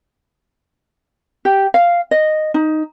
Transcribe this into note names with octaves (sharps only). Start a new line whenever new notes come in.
G4
F5
D#5
D#4